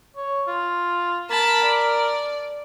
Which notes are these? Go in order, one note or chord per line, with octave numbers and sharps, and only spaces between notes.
C#5
F4
A#4 A5 B5
D5